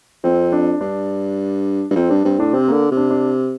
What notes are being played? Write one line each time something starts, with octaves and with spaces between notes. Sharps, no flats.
F2 C4
D4
G2 D4
G2
F2 C4
G2 D4
G2 C4
A2 D4
C3 C4
D3 A#3
C3
D4
D4